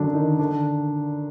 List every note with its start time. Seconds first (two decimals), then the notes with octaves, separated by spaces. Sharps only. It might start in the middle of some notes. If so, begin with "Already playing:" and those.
Already playing: F#2 D3 F#3 D4
0.14 D#3 D#4
0.39 D3 D4